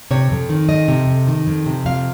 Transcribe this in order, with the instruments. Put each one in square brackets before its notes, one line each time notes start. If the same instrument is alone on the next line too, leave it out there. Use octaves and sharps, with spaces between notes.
[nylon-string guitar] C3 C#5
F2
D#3
F2 D#5
C3
F2
D#3
F2
C3
F2 F5